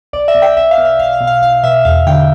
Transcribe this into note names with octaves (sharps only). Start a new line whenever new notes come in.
B1 D5
E5
B2
G5
B1 E5
F5
B2
E5
B1 F5
F5
B2
F5
B1 F5
B2 E5
E2 F5
D3 G5